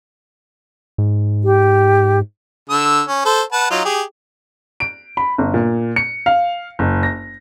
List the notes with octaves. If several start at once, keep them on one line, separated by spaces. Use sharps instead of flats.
G#2
G4
D3 E6
C#4
A4 C5
B4 F#5 A5
F#3 D#4 F4
G4 G#4
D7
B5
G1
A#2
C#7
F5
F#1
A#6